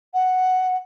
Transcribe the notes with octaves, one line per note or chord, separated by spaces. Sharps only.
F#5